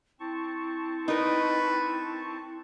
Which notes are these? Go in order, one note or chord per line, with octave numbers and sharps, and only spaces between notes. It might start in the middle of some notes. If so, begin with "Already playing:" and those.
C4 E4 A5 C#6
D#4 A#4 B4